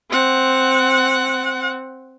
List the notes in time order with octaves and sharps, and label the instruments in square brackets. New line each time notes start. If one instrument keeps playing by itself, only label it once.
[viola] C4 F#5